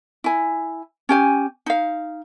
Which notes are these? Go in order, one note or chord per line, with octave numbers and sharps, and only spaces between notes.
E4 G#5
C#4 G4 G#5
D#4 F5